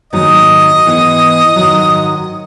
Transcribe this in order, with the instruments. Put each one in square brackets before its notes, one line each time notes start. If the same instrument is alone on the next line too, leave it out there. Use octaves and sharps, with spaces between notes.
[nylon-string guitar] G#2 D#3 F#3 A#3 D#4 [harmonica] D#5
[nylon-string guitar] G#2 E3 B3
G#2 D#3 F#3